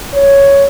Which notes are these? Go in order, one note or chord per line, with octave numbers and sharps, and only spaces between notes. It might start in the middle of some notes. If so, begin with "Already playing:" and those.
C#5